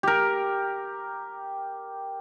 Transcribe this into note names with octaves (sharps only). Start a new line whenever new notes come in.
G4 A#4